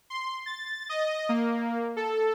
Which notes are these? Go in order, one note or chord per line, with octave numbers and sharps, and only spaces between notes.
C6
A6
D#5
A#3
A4